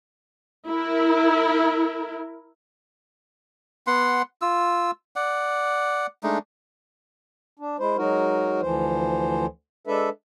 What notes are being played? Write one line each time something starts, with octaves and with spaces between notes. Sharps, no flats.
E4 A#4
B3 F#5 C6
F4 E6
D5 F#5
G#3 A3 D4 D#4
D4
G#3 E4 C5
F#3 G#3 D#4 F#4 A#4
D2 E3 F3 C5
G#3 D4 A4 B4 E5